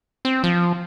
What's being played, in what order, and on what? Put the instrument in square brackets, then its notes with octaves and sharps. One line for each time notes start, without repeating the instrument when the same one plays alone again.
[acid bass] C4
F3